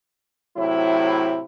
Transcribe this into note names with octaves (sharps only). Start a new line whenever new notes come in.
A2 C3 F#3 E4